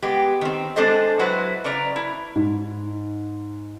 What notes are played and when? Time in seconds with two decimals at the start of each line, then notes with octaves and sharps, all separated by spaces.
0.02 G#3 B3 G4
0.41 D#3 C4
0.76 G#3 C4 D4 A4 C5 D#5
1.19 F#3 E4 F#4 B4 C5
1.64 C#3 B4 D5 A#5
1.96 E4
2.36 G#2